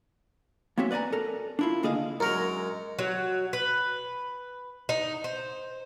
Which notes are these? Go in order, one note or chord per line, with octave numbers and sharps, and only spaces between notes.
A#3 C4 C#4 F#4 E5
B4 D5 D#5 G#5 A#5
A4 A#4
D4 E4 F4
C#2 D3 A#3 G#4 D#5 F5
F#2 F#3 G#3 A#4
F#3
B4
D#4
C5